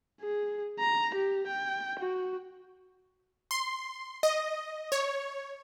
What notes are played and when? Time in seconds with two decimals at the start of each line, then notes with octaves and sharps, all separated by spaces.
0.21 G#4
0.79 A#5
1.15 G4
1.47 G5
1.99 F#4
3.51 C6
4.23 D#5
4.92 C#5